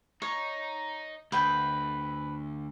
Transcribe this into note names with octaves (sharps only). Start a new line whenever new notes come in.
D#4 C#5
D2 B4 G5